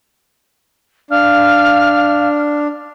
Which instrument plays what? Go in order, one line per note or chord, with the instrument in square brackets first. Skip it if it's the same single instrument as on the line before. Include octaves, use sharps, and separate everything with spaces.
[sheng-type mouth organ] D4 [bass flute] F5 [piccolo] F6